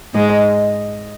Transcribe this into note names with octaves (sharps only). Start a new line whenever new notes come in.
G#2 G#3 D#5
D#5